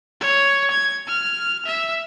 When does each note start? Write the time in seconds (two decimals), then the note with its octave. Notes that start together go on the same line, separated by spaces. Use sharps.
0.21 C#5
0.71 G#6
1.08 F6
1.66 E5